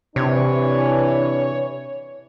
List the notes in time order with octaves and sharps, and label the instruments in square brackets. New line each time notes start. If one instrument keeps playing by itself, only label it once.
[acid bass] C3 [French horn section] E3 D4 [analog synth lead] C#5